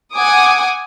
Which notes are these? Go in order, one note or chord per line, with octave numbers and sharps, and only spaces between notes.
F#5 G#5 D6 D#6